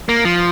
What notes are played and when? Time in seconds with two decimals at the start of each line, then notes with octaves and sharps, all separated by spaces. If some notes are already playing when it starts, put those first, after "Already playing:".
0.09 A#3
0.25 F3